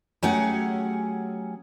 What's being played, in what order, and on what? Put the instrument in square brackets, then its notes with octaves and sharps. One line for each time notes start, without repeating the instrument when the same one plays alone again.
[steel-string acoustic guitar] F#3 A3 C#4 G4 G#4 F#5